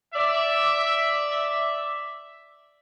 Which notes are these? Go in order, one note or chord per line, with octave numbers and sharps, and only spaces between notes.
D5 E5